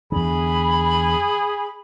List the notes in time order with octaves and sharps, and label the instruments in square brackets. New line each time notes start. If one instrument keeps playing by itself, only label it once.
[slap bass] E2 D3 [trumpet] G#4 [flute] B5